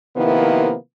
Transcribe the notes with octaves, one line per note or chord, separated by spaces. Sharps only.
C3 D#3 F3 A#3 B3 E4